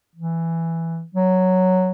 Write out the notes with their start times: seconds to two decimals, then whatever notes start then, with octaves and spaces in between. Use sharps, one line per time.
0.16 E3
1.15 F#3